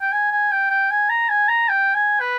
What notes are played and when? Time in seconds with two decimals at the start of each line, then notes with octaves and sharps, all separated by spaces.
0.02 G5
0.12 G#5
0.31 G#5
0.52 G5
0.71 G5
0.90 G#5
1.10 A#5
1.29 G#5
1.48 A#5
1.69 G5
1.94 G#5
2.20 B4